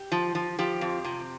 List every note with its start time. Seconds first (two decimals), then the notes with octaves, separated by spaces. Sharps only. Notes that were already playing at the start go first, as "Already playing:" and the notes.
Already playing: G4
0.12 F3
0.35 F3
0.59 F3 G4
0.81 F2
1.05 C3